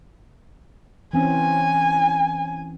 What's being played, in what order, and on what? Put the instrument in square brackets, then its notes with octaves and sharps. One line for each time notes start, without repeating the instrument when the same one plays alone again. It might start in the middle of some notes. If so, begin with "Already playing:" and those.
[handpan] E3 C4 C#4 [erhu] G#5